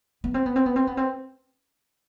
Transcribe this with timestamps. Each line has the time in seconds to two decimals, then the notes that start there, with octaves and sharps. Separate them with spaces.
0.24 B3
0.34 C4
0.46 B3
0.56 C4
0.66 B3
0.76 C4
0.87 B3
0.97 C4